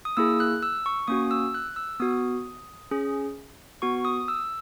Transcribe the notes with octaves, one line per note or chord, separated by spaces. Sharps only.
D#6
A#3 E4 G#4 E6
F#6
E6
C#6
A#3 C#4 F#4 D#6
E6
F#6
E6
B3 F#4 D#6
C#4 G#4
B3 F#4 C#6
D#6
E6